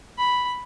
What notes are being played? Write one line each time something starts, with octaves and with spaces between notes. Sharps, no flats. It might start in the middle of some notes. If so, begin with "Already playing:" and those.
B5